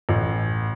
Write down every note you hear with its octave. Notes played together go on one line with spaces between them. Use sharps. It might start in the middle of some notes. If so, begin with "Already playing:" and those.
A1